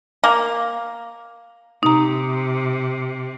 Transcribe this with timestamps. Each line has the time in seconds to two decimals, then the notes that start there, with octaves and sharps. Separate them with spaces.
0.24 A#3
1.83 C3 D#4 A#5